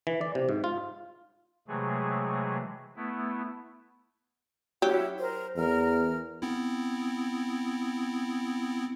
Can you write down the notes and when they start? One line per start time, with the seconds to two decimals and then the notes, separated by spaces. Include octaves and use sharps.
0.07 E3
0.21 D5
0.35 C3
0.49 G#2
0.64 F4
1.68 C3 E3 F#3 G#3 A3 G#4
2.96 A3 B3 E4
4.82 F#3 C#4 E4 G4 F#5
5.18 A#4 C5
5.56 E2 A#4 F6
6.42 B3 C4 E4